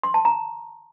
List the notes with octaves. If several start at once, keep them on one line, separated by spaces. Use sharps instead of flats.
C6
A5
A#5